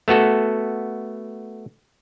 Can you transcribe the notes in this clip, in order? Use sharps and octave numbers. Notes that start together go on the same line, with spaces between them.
A3 B3 F#4 A4